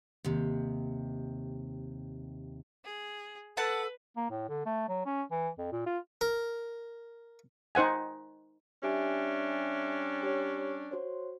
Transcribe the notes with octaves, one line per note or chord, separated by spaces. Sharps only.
D#2 C3
G#4
A4 B4 F#5 A5
A#3
A2
D3
A3
F#3
C#4
E3
F2
A#2
F4
A#4
D#4 C5 F#5 G#5
G3 C#4 D4 G4 E5 G#5
G4 C#5
F#4 C5 C#5